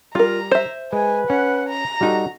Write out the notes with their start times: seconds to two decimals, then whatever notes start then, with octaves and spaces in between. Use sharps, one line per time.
0.15 G3 F4 A#4 A#5
0.51 C5 E5
0.93 G#3 B4 G#5
1.30 C#4 F#5
1.69 A#5
2.01 G3 D#4 F#4 A4